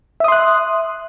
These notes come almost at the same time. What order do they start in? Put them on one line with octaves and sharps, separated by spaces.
E5 D#6 C6 F#6